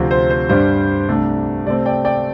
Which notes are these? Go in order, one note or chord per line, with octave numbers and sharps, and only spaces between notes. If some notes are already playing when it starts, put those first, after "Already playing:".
Already playing: D2 C3 F3 C4
C5
C5
G2 G3 D4 C5
C2 C3 A3 D4
C3 A3 C4 D5
D5 G5
D5 G5